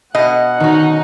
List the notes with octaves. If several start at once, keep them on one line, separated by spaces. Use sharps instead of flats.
B2 D#5 F#5
D#3 C#4 D#4 F#4